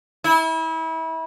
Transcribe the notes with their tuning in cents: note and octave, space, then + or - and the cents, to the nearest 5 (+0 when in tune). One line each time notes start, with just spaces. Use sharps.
E4 -30